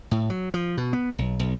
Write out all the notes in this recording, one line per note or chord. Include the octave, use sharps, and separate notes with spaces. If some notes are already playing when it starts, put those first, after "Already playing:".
A2
F#3
F3
B2
B3
B1
B1